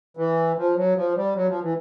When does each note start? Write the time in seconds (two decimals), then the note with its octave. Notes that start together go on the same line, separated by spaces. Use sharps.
0.17 E3
0.57 F3
0.76 F#3
0.95 F3
1.16 G3
1.35 F#3
1.48 F3
1.62 E3